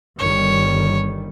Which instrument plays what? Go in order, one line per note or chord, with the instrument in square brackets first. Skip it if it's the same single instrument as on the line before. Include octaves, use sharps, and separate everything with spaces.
[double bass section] G1 D#3 G3 [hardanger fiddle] C#5